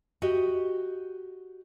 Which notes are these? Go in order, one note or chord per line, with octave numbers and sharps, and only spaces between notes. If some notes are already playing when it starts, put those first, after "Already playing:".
F#4 G4 D#5